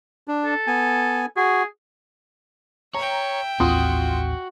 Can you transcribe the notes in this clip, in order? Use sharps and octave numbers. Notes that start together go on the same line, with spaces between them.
D4
A4
B3 G#5
F#4 G#4
C#5 E5 G5 A#5
A1 D#2 C4 F4 F#4 C6 D#6